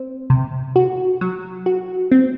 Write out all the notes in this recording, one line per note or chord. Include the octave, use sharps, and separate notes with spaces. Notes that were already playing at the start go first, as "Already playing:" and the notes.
Already playing: C4
C3
F#4
F#3
F#4
C4